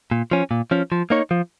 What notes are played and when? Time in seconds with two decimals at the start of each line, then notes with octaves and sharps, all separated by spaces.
0.11 A#2
0.31 F3 C#4
0.51 A#2
0.71 F3 C#4
0.92 F3
1.10 A#3 D#4 C#5
1.31 F3